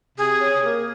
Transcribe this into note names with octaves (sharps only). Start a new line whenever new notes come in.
C3 G#4
C#4
A#3